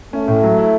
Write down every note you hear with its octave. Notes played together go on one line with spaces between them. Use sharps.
A3 C#4
A2
F#3
E4